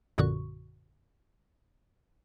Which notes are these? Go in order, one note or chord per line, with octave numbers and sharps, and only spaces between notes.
A#1 F#2 A#2 D3 F#4 C#6